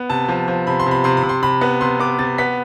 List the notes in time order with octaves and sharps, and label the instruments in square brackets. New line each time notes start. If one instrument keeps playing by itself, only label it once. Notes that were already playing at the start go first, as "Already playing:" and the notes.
Already playing: [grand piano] B3
C3 A5
F3
F3
C3 B5
C6
C3 B5
C3 C6
B5
C3
C6
C3 B5
B3
C3 C6
B3 D6
C3 A6
B3 B6